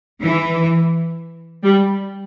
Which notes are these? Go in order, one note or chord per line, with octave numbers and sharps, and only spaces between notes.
E3
G3